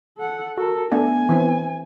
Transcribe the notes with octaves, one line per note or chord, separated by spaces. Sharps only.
A4 F#5
F#4 A4 A#4
A3 B3 D4 G#5
E3 C4 E4